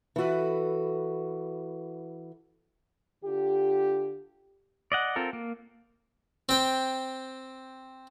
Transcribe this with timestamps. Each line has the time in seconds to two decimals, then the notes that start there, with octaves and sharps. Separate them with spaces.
0.16 E3 F#4 A4 B4
3.24 D3 F4 G4
4.92 D5 D#5 F#5
5.16 C4 F4 A4 A#4
5.33 A#3
6.49 C4 G5